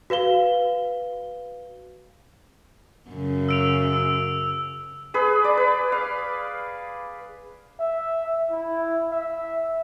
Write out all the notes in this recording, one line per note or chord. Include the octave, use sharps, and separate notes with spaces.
F#4 B4 F5 G7
F#2 C#3
E6 D7 F7
E6
G#4 B4
D5
B4
F5
E5
E4
E5